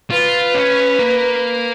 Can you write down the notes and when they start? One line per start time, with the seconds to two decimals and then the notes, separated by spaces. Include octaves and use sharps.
0.11 F4 B4
0.55 C#4
0.99 A#3